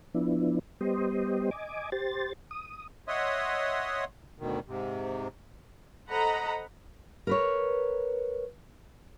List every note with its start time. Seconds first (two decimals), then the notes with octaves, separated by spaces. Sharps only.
0.14 F3 B3 D4 E4
0.81 G3 B3 G4 C5 D#5
1.51 D#5 G#5 D6
1.92 G4 C5 A6
2.51 D#6
3.08 C#5 D#5 E5 F#5 C6 D#6
4.39 D2 B2 D#3
4.67 G#2 C3
6.10 A4 C5 D#5 F#5 A#5 B5
7.27 A#4 B4 C#5